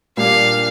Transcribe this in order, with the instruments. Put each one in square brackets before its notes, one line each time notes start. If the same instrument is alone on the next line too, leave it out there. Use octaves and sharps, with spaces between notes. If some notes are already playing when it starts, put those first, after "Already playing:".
[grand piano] A#2 G3 A#3 D4 [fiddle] F5